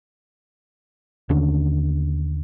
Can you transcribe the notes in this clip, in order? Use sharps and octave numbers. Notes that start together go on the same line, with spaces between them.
D#2 D3 C#4 D4